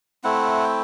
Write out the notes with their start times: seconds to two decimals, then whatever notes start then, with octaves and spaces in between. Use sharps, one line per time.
0.24 A3 C4 E4 F#5
0.63 G5